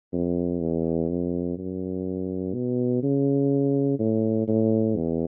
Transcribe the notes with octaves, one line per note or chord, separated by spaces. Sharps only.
F2
E2
F2
F#2
B2
C#3
A2
A2
E2